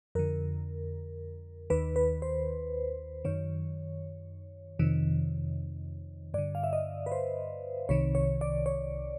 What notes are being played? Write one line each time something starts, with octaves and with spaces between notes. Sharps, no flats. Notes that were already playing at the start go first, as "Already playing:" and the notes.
F2 D3 A#4
D#2 D#3 B4
B4
C5
F#2 D#3 C#5
F2 C3 D#3
G2 D3 D5
F5
E5
D#5
B4
C5
C2 C3 D#3 C#5
C#5
D5
C#5